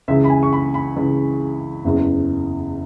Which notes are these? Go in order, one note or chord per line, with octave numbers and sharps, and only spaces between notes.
C#2 C#3 E3 E5
B5
G#5
C#6
B5
B5
C#2 C#3 E3
F#1 E2 C#3 E3